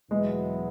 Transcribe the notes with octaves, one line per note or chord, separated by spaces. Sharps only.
E2 B2 F#3 G#3 B3 E4